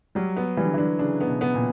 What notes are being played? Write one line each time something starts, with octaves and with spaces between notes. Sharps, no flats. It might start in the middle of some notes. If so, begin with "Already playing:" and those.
F#3 G3
B3
E3 G3
D3
E3 D4
C#3 D4
B3
B2
B3
A#2